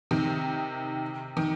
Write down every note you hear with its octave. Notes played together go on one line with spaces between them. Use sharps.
C3 D#3
D#3